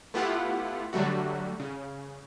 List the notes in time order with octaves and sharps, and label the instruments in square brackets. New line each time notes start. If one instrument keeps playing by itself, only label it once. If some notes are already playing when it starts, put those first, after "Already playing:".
[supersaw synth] A3 B3 E4 F4 G4 F#5
D3 F#3 G3 A3 F#4
C#3